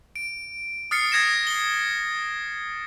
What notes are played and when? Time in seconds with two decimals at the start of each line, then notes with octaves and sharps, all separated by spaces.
0.16 D7
0.91 D#6 F6 A6 C7 C#7
1.12 D#6 G#6 A#6 E7
1.47 C7 G7